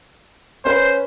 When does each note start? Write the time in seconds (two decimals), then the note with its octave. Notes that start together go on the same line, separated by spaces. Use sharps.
0.65 C#4 B4 C5